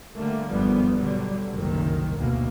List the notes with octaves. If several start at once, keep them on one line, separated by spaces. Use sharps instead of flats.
D3 G3 A3 A#3
G1 E2 G#2 F3 G3 B3
B2 D3 F#3 G3
F#1 C2 D#3
D2 B2 A#3